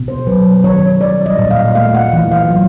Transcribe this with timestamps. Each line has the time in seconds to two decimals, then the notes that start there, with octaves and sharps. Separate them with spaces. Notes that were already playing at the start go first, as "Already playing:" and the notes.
Already playing: B2
0.08 C5
0.27 F#3 B4
0.64 D#3 C#5
1.01 G3 D5
1.26 D#5
1.38 A#2
1.51 F5
1.75 A3 F5
1.95 F#5
2.13 E3
2.32 F5
2.50 F#3